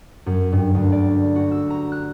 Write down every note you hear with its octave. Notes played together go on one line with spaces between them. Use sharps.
F#2
G2
D2
D5
F#4
E6
A#5
F#6